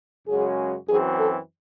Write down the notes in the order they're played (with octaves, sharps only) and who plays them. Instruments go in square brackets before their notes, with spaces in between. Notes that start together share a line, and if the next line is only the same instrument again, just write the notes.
[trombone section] F#2 C#3 G#3 C#4 F#4 [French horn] G#4
[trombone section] F#2 E3 C4 F#4 [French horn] G#4
[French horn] A4